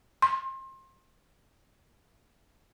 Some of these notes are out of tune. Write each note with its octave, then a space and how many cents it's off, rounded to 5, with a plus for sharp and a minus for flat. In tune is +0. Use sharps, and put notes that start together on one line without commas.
C6 +30